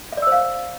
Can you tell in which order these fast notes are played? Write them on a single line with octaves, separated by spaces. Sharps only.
E5 D5 E6 C5 F5